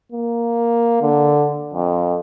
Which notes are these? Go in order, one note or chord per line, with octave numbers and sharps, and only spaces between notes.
A#3
D3
F2